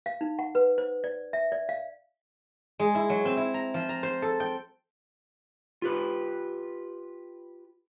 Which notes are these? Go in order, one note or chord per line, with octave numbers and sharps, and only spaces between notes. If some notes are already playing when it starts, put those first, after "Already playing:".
F5
D#4
F#5
B4
C5
D5
E5
D5
F5
G#3
E4
F#3
C4
E4
A#5
F3
A#5
C5
A4
G5
F4 G4 B4